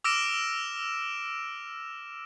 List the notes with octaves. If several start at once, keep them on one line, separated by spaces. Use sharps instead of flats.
D6 E6 F6 A#6 D7 E7